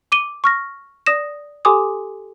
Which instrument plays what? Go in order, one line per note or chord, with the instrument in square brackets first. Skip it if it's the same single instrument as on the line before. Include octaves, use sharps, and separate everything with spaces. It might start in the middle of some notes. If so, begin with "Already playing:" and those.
[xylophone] D6 D#7 G7
C#6 F6 A#6
D5 D#6 A#6 E7
G4 A4 G#5 C6 D6 D#6